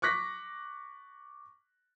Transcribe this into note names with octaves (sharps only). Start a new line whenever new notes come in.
C#6 D6 F#6 A#6 B6